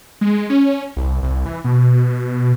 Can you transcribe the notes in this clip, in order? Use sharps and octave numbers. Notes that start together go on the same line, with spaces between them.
G#3
C#4
C2
C2
E3
B2